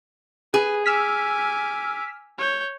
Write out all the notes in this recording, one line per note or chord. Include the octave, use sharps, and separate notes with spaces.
G#4 B4
G#5 D6 E6 F6 B6
C#5 G6